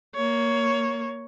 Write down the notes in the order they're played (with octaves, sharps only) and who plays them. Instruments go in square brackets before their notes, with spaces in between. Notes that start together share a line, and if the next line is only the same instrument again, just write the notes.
[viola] A#3 C#5